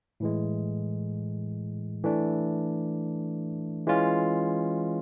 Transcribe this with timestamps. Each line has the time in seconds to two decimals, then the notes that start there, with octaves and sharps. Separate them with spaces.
0.20 A2 E3 G#3
2.04 E3 A3 D4
3.87 E3 G#3 C#4 F4